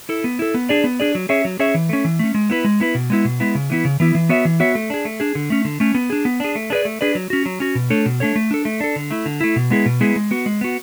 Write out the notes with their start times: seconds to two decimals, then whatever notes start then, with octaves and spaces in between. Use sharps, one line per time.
0.09 E4 A4
0.24 B3
0.39 E4 A4
0.54 B3
0.69 D4 G#4 D5
0.84 B3
1.00 D4 G#4 D5
1.15 F#3
1.29 C#4 G#4 C#5 E5
1.45 F#3
1.59 C#4 G#4 C#5 E5
1.75 E3
1.89 A3 C#4
2.05 E3
2.19 A3 C#4
2.35 G#3
2.50 B3 E4 B4
2.65 G#3
2.80 B3 E4 B4
2.95 B2
3.10 G#3 B3 E4
3.25 B2
3.40 G#3 B3 E4
3.55 C#3
3.70 E3 B3 E4
3.85 C#3
4.00 E3 B3 E4
4.15 E3
4.29 B3 F#4 C#5 E5
4.45 E3
4.60 B3 F#4 C#5 E5
4.75 A3
4.90 D4 G#4
5.05 A3
5.20 D4 G#4
5.35 D3
5.50 A3 C#4
5.65 D3
5.80 A3 C#4
5.95 B3
6.10 D4 G#4
6.25 B3
6.40 D4 G#4
6.55 A3
6.70 D4 G#4 B4 D5
6.85 A3
7.01 D4 G#4 B4 D5
7.15 F#3
7.30 C#4 F#4
7.46 F#3
7.60 C#4 F#4
7.75 B2
7.90 A3 D4 A4 C#5
8.06 B2
8.20 A3 D4 A4 C#5
8.35 A3
8.51 D4 A4
8.65 A3
8.80 D4 A4
8.96 D3
9.11 A3 E4
9.26 D3
9.41 A3 E4
9.56 B2
9.70 G#3 B3 E4 G#4
9.86 B2
10.01 G#3 B3 E4 G#4
10.16 G#3
10.31 B3 F#4
10.46 G#3
10.61 B3 F#4